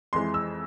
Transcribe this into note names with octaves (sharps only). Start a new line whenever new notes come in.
F2 E3 G#3 C6
E6